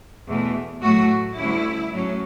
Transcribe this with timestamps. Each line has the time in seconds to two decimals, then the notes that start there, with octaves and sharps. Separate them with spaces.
0.27 E2 B2 A3
0.81 A2 F#3 A3 F#4
1.37 D2 D3 G3 C#4 E4
1.93 A2 F#3 A3 C#4